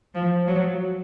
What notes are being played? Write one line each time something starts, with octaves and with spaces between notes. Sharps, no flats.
F3
F#3